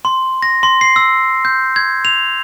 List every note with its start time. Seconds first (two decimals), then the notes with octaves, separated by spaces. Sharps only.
0.05 C6
0.42 A#6
0.63 C6
0.81 C7
0.96 E6
1.45 G6
1.76 G#6
2.05 F7